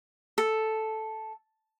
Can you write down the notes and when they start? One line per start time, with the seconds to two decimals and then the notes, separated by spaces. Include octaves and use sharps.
0.38 A4